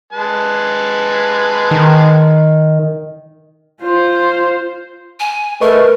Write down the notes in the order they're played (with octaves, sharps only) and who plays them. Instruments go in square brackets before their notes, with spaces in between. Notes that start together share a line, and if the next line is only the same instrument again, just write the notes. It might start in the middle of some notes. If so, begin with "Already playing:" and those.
[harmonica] G#3 B4 A5
[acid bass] D#3
[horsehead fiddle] F4 C5
[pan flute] G#5
[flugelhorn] A3 [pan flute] A#4 [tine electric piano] B4 D#5 C#6